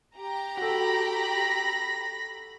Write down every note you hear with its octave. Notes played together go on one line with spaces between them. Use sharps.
G4 A#5
F#4 A4 B5 A#6